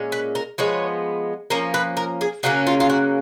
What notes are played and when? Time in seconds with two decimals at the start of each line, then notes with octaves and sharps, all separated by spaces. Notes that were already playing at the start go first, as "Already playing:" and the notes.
Already playing: A#2 G#3 C#4
0.12 B4
0.35 A#4
0.58 F3 G#3 B3 C#5
1.50 F3 A#3 C#4 A#4
1.74 B4
1.97 A#4
2.21 G#4
2.43 C#3 F#3 A#3 C#4 F#4
2.67 F4
2.80 F4
2.90 F#4